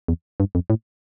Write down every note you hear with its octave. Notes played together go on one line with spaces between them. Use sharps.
E2
G2
F2
A2